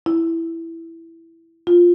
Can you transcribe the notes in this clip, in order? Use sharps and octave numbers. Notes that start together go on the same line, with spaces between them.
E4
F4